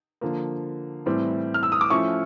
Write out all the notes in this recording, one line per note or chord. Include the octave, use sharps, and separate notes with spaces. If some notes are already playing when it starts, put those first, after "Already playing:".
D3 F3 A#3
A2 E3 G3 C4 E4
F6
E6
D#6
D6
F3 A3 C#4 E4 C#6